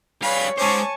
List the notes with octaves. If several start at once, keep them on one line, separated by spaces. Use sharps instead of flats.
G3 G#4 B4 C#5 F5 B5
G#3 C#4 C5 G#5 A5 C#6 D6